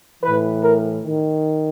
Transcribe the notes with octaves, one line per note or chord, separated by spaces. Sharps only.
A2 E3 B4
A#4
D#3